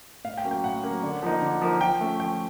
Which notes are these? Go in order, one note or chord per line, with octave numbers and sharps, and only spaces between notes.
A2 F5
G5
F#3 A#3 C#4
G5
A2 F#5
F#3 A#3 C#4
D3
F3 A#3 D#4
D3
F3 A#3 D#4
F3 G5
A3 C#4
F3 G5